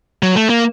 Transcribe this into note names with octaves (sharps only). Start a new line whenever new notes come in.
F#3
A3
A#3